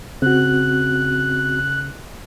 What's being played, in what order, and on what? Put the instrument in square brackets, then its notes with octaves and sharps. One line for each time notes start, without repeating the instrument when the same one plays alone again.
[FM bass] C#3 [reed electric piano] C4 F#4 [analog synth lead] F#6